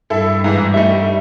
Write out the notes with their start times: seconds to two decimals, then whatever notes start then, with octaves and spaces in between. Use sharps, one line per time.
0.10 G2 E4 A4
0.44 G#2 E3 E4
0.74 G3 A3 D#4 D5 E5